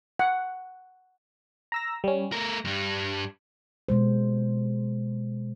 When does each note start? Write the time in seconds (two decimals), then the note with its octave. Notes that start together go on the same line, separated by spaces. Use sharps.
0.19 F#5
1.72 A#5 E6 A#6
2.04 G3 C#4
2.32 A3 A#4 A#6
2.65 G2 G3
3.89 B2 G#3 C5